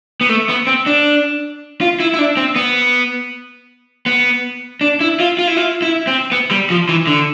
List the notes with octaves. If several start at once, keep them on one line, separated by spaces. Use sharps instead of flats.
B3
A3
B3
C4
D4
F4
E4
E4
D4
C4
B3
B3
D4
E4
F4
F4
E4
F4
E4
C4
B3
G3
F3
E3
D3